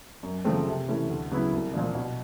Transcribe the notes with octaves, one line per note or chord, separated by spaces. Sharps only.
F#2
C#3 F3 A3 C4
C3
E3 A3 C#4
D2
C#3 F#3 B3 E4
C2
A#2 F3 A#3 D4
B2